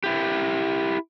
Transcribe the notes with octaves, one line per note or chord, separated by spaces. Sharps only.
E4 G4